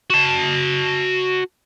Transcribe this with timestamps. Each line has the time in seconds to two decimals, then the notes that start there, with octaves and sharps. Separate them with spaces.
0.10 F#4 A5